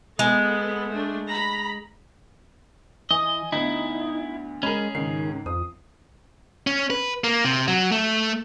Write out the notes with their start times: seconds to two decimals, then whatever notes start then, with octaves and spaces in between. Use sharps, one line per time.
0.19 G#3 B3 A4
0.92 A3 D4
1.28 A#5 B5
3.11 E3 D#5 G#5
3.52 D2 B3 D#4 E4
4.63 G#3 C#4 G#4 A#4 A#5 B5
4.95 C#2 G#2 D#3 C7
5.46 F2 D#6
6.67 C#4
6.90 B4
7.24 A#3
7.45 C3
7.68 F#3
7.92 A3